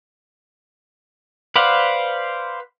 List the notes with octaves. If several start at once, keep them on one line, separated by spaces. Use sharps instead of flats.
B4 C5 D5 F5 F#5